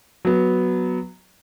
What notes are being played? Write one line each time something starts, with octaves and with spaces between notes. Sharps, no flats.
F#3 B3